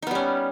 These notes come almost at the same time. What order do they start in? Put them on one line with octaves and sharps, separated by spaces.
D#4 B3 G3 C#4